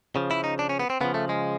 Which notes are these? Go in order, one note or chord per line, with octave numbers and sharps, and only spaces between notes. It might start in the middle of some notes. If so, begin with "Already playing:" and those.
C#3 F3
E4
D#4
D4
C#4
B3
C4
C#3 F3 B3
A3
G#3